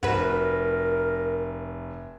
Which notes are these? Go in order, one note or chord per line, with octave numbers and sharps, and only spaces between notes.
F1 F#4 A#4 B4